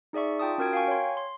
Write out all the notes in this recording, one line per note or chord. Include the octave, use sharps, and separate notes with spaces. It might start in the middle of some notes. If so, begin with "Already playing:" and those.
D#4 G#4 D5 E5 C#6
F4 G5 A5 D#6
C#4 F#4 A#4 G5 G#6 D7
F5 G5 G#5 C#6
C#5 C6
C6